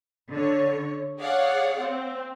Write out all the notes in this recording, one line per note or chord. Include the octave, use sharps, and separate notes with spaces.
D3 C#5
G#4 C#5 D5 F5 F#5
C4